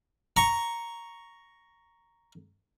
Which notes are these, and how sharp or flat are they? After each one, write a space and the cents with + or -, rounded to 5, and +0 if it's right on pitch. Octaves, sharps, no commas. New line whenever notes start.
A#5 +0 C#6 +0